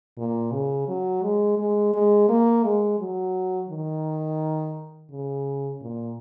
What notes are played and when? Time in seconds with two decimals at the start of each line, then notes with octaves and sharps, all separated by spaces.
0.17 A#2
0.52 C#3
0.88 F#3
1.23 G#3
1.58 G#3
1.94 G#3
2.29 A#3
2.64 G#3
2.99 F#3
3.69 D#3
5.11 C#3
5.81 A#2